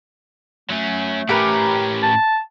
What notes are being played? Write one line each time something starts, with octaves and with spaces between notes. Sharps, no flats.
F#3 A3 C#4
A2 C#4 G4 A#4 B4
A5